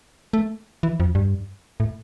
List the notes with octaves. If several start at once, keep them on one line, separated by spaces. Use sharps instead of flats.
A3
E3
F2
G2
A2